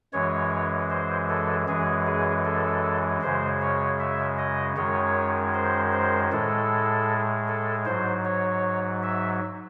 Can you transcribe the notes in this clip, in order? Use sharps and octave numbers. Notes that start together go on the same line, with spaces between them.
F#2 E3 G#3 C#5
C5
A4
F#2 E3 G#3 G#4
G#4
A4
F#2 C#3 G#3 C5
C#5
E5
D#5
F#2 D#3 G#3 C#5
C5
C5
A2 G#3 A4
A4
G#2 F#3 C5
C#5
E5